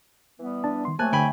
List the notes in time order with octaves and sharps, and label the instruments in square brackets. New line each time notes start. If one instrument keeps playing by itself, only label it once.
[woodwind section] E3 G3 B3
[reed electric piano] D4 A5
D#3 C6
[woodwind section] C3 F#3 A3 [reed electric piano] A#3 A5 F#6 [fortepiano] G#5
[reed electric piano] D3 [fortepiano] G5 G#5 B5